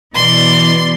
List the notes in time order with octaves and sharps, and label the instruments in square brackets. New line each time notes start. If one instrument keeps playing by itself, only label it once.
[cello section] B2 E3 D5 [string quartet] C6